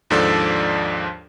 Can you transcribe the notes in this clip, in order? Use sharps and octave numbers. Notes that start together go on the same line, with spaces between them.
D#2 G#2 F3 D4 A4 D5